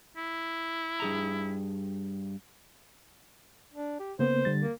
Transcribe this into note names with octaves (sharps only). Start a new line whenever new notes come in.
E4
G2 G#4 A#5
D4
G4
C#3 A#3 B3 C5
D3 G3 A6
A#3